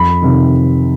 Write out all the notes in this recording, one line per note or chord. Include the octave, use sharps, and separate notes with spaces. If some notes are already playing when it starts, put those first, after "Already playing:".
Already playing: F2 B5
C3 D#3